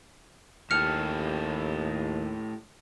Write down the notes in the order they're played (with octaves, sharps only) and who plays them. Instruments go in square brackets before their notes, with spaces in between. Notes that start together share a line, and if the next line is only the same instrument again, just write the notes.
[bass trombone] D#2 [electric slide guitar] A2 G4 A4 [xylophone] F6 C#7 F7